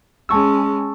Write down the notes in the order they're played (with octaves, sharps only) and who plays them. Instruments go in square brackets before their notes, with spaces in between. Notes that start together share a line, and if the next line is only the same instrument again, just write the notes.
[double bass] G#3 C#4 [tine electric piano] A5 C#6 E6